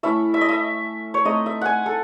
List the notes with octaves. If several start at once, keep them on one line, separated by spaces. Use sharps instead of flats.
A3 C#4 E4 E5
E5
D#5
E5
C#5
A3 C4 D#4 D#5
E5
F#5 G#5
A4